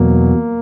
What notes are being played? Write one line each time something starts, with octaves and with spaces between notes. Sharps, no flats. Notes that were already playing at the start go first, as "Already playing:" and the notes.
Already playing: E2 B2 F#3 A#3